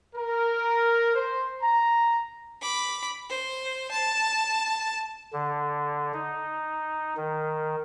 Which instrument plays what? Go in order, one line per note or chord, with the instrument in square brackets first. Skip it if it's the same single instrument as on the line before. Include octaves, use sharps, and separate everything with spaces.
[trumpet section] A#4
C5
A#5
[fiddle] B5 D6
C5
A5
[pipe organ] D3
D#4
D#3